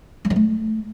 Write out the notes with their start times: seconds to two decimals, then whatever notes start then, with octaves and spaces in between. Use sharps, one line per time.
0.25 G3
0.30 F3
0.36 A3